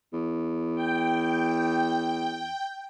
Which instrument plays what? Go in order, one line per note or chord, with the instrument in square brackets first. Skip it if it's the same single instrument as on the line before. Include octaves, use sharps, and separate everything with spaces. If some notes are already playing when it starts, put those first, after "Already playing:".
[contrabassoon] E2
[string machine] G5